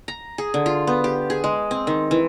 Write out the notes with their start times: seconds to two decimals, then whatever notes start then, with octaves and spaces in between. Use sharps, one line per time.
0.08 A#5
0.38 G#4
0.54 D3
0.66 F4
0.87 B3
1.04 G4
1.30 G#4
1.44 G#3
1.71 C4
1.87 D#3
2.11 E3